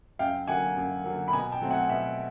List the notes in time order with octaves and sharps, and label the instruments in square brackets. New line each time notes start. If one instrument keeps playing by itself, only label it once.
[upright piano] F#2 F5 G5
D3 F#3 A#3 F#5 G#5
F#2
D3 F#3 A#3
B5
B2 G#5 A#5
G5 A5
F#3 A3 C4
F#5 G#5
B2 E5 F#5